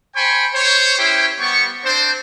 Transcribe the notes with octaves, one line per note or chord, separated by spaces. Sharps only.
C5 G5 G#5 B5 C#6
C5 C#5
C#4 E4 G4 C5 G5
G3 B3 C#6
C4 D4 C5